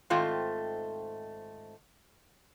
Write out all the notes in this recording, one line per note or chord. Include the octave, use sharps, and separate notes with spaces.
G#2 D#3 A3 C4 F4